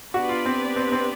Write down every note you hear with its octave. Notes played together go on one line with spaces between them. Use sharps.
B3 D4 F#4 G4 B4 D5
F4
C4
C4
C4